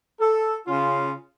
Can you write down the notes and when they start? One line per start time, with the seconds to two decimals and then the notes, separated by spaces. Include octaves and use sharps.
0.20 A4
0.67 C#3 C#4 F4